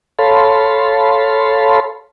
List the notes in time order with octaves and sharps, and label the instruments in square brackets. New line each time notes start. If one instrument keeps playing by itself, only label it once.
[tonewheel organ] A4 C#5 F5 A5 B5 C6